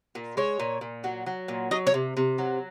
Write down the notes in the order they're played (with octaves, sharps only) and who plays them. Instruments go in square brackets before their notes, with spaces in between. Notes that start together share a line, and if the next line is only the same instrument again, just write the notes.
[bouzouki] A#2
G#3 C#5
A#2
A#2
F#3
F#3
A#2
F#3 D#5
C#5
C3
C3
F#3